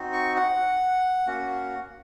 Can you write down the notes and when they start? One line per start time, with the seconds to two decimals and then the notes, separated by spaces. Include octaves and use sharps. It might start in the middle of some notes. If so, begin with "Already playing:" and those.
Already playing: C4 D#4 F#4
0.13 C#6
0.36 F#5
1.27 A#3 C#4 F#4